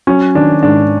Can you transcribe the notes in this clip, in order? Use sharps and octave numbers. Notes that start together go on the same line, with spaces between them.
F#3 C#4
D#3 D4
G#2 D4